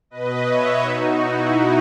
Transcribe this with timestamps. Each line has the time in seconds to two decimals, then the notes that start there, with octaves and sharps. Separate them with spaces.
0.10 B2 B4 D#5
0.46 C#5 E5
0.82 B2 D#4 F#4
1.19 E4